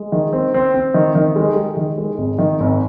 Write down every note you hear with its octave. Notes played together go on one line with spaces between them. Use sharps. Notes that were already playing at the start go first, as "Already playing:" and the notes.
Already playing: G#3
D#3
C4
C4
C4
D#3
D#3
G#3
G#3
D#3
G#3
G#1
D#3
G#1